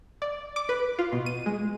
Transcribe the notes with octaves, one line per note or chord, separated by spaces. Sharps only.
D5
D6
B4
F4
B2
D#7
G#3